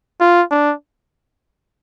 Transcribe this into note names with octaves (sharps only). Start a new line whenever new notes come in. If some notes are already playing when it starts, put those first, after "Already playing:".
F4
D4